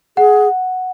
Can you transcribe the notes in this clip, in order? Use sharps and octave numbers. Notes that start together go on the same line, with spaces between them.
G#4 F#5